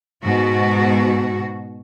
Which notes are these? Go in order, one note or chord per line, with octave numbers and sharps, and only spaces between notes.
G#2 B2 F#4